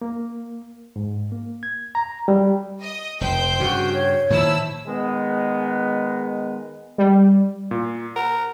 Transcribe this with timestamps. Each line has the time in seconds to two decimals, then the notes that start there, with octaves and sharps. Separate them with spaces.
0.02 A#3
0.96 G#2
1.32 A#3
1.63 G#6
1.95 A#5
2.28 G3
2.83 D#5 D#6
3.21 F1 C5 G5 G6
3.60 G2 C#3 F#4
3.94 C#5
4.30 A#2 D#3 F3 E4 A5 E6
4.87 D#3 G#3 B3
6.98 G3
7.71 A#2
8.16 A#4 F#5